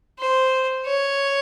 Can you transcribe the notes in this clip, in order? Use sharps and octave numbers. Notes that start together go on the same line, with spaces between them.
C5
C#5